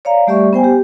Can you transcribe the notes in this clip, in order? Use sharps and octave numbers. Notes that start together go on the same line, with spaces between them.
C#5 D5 F5 A#5
G3 A3 G4 D5 E5 C#6
B3 C5 G5 G#5
G4